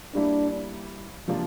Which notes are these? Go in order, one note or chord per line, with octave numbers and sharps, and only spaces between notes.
G3 A#3 D4 E4
C3 F3 A#3 D4 F4